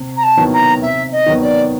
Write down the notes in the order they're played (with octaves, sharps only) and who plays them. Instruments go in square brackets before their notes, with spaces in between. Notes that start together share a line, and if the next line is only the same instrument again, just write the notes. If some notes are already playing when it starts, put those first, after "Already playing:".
Already playing: [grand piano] C3
[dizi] A#5
A5
[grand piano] D#3 F#3 B3 E4
[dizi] A#5
[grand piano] C3 [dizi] E5
[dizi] D#5
[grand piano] D#3 F#3 B3
[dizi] D5